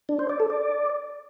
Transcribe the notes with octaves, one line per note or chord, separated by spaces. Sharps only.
D4
C5
D5
A4
D5